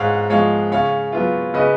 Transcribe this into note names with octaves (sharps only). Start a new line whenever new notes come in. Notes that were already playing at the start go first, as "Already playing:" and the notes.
Already playing: G#2 G#3 C#5 F5 F#5
F3 G#3 C#5 F5
C#3 C#5 F5
F#3 B3 F4
C#3 B4 D#5